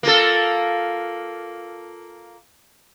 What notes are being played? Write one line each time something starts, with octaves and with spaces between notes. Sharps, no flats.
A#3 F4 A4